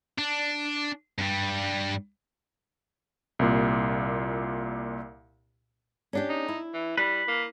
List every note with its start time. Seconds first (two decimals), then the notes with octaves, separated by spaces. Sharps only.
0.18 D4
1.18 G2 G3
3.39 C2 A#2
6.13 C#4 D4 G4
6.29 D#4
6.48 E4
6.74 E3
6.98 G3 B4
7.28 A#3